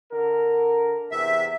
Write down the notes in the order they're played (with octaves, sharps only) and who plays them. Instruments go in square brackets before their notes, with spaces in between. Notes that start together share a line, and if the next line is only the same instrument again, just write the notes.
[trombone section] D3 A#4
[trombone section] E2 C3 [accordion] E5